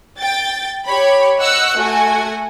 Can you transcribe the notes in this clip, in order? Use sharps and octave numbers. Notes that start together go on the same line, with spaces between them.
G5 A6
G4 C#5 B5
D#5 F#5 C#6 E6 F#6
A3 F#4 G#5